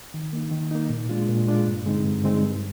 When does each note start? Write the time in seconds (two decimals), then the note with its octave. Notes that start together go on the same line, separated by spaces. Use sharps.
0.14 D#3
0.33 A#3 D#4
0.51 D#3
0.71 A#3 D#4
0.89 A#2
1.09 G#3 D4 F4
1.29 A#2
1.47 G#3 D4 F4
1.67 G2
1.86 D3 G#3 C4 D#4
2.05 G2
2.24 D3 G#3 C4 D#4
2.43 G2